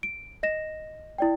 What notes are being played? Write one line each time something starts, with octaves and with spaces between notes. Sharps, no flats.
D7
D#5 A#6 E7
E4 D5 G5